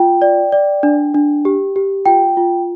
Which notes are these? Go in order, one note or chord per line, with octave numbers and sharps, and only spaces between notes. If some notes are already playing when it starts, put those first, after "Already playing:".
Already playing: F4 G5
D5
D5
D4
D4
G4
G4
F4 G5
F4